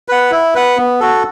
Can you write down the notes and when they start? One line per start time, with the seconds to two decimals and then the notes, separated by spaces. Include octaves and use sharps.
0.08 B4 F#5
0.31 E4
0.55 B4 F#5
0.77 B3
1.00 F#4 A4